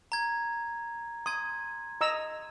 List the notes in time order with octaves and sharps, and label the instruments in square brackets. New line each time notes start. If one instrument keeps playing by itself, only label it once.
[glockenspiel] A#5 G#6
[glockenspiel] C6 G#6 [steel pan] D#6
[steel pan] D#5 A#5 E6